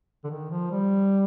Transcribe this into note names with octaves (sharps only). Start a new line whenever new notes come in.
D3
D#3
F3
G3